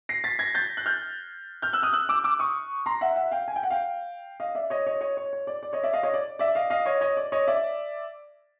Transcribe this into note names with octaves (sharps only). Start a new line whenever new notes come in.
A#6 C7
A6 B6
G#6 A#6
G6 A6
F#6
F6 G6
F6 G6
E6 F#6
D#6 F6
E6 F#6
D6 E6
D6 E6
C#6 D#6
A#5 C6
E5 F#5
E5 F#5
F5 G5
G#5
G5
F#5
F5 G5
D#5 F5
D5 E5
C#5 D#5
C#5 D#5
C#5 D#5
C#5
C#5
D5
D5
C#5 D#5
D5 E5
D#5 F5
C#5 D#5
D5
D5 E5
D#5 F5
D#5 F5
C#5 D#5
C#5 D#5
D5
C#5 D#5
D5 E5